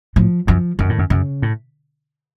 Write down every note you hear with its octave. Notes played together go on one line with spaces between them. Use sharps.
A2 F3
F#2 F3
F#2 D#3
A2
F#2
F#2 C#3
A2